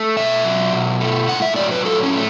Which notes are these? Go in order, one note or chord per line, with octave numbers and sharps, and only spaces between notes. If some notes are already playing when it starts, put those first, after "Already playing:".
Already playing: A3
B2 E5
F#3
B2
A3
A2 F#5
E5
F#3 D5
B4
A2 A4
C#4
A3